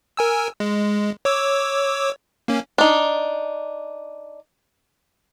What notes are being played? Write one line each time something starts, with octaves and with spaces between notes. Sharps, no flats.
A#4 G#5 E6
G#3
C#5 D6 E6
A#3 C#4
D4 D#4